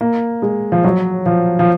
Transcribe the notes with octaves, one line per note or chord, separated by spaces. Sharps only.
A#3
G#3
F3
F#3
F3
F3